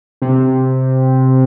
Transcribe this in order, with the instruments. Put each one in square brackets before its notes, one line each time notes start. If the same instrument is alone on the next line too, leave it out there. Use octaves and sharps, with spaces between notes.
[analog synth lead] C3